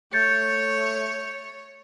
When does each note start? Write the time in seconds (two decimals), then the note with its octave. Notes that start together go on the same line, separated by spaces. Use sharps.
0.13 A3 C#5 G6 A6 C#7